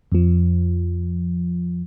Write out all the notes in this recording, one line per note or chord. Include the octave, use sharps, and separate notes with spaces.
F2 F3